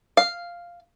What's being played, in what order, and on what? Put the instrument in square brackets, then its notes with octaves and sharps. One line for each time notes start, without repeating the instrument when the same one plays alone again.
[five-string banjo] F5